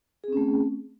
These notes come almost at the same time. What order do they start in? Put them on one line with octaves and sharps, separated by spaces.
G#4 C4 C#4 A3